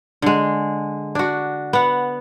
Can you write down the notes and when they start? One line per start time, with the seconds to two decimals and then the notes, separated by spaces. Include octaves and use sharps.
0.22 D3 G#3
1.15 D4 F#4
1.73 B3 F#5